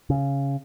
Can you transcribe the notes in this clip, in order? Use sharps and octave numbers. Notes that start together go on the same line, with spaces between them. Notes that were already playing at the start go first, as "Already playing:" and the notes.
C#3